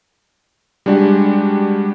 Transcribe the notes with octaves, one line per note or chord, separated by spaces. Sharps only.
G3 G#3 D4 F#4 G4